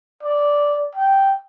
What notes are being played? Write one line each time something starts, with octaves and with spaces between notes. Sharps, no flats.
D5
G5